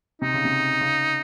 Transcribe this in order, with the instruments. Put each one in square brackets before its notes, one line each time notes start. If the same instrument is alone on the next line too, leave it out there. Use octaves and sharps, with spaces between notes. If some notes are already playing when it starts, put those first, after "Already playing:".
[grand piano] C3 [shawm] D#4
[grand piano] C#3
C3
C#3